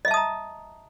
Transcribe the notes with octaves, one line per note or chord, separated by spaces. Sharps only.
D#5 E5 A5 A#5 D#6